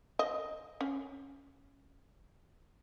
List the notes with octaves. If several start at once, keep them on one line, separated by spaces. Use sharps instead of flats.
D#5
C#4